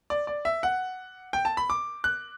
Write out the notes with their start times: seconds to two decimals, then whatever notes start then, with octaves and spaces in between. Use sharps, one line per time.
0.10 D5
0.27 D5
0.45 E5
0.63 F#5
1.33 G5
1.45 A5
1.57 B5
1.70 D6
2.04 F#6